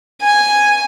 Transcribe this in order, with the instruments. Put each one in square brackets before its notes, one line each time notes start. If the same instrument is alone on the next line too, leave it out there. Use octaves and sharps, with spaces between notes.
[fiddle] G#5